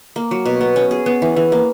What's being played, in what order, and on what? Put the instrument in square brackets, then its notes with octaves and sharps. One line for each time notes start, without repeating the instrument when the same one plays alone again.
[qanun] A#3
F#3
B2
B3
C#4
G#4
B3
E3
E3
A#3